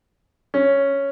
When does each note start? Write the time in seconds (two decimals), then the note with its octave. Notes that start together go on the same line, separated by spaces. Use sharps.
0.54 C#4